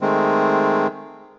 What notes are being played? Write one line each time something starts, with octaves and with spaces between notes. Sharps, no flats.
D#3 G#3 A3 C4